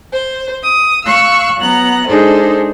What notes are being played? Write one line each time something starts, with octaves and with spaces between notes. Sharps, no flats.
C5
D#6
F5 C#6 E6 F#6
F#3 B3 A#5 F#6
G#3 D4 D#4 G#4 A4 C5